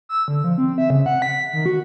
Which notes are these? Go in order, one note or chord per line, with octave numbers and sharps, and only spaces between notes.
E6
D3
F3
C4
E5
C#3
F#5
B6
D#3
F#4